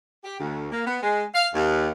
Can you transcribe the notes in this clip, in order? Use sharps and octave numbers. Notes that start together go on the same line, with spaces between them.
G4
D2
A#3
B3
G#3
F5
D#2